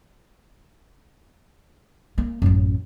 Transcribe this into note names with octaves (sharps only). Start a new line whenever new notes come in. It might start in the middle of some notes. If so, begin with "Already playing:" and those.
A#3
A1 F#2